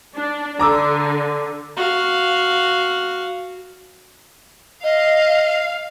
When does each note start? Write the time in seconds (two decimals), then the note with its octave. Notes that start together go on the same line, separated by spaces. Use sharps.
0.15 D4
0.59 D3 A#5 D6 E6
1.77 F#4 F5
4.84 D#5 F5